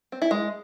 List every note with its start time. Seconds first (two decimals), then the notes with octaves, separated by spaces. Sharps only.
0.12 C4
0.22 E4
0.31 G#3